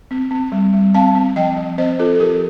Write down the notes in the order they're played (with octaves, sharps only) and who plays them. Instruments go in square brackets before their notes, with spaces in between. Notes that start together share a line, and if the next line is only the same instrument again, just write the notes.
[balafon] C4
C4
G3
G3
C4 F5 A5
C4
F3 D#5 G5
F3
C4 C5 D#5
C4 F4 A4
A4
F3 G4 A#4